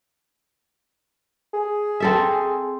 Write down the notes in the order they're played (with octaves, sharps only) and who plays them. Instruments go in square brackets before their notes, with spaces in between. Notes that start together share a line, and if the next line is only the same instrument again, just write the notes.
[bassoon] G#4
[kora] C4 A4 E5